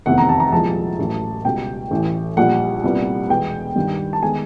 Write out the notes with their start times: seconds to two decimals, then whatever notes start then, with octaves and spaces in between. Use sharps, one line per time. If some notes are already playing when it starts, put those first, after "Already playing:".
0.06 F1 E2 C3 D#3 F#5
0.18 A#5
0.29 A5
0.40 A#5
0.52 C2 A#2 F3 G#3 A5
0.99 A1 A2 F#3 A3
1.45 C#2 B2 G3 B3 G5
1.91 A1 A2 E3
2.37 A#1 A#2 G3 F#5
2.84 C2 A#2 G3 B3
3.29 E2 B2 G#3 B3 G5
3.75 G2 D#3 G3
4.13 A5
4.23 D#3 G#3 B3 G#5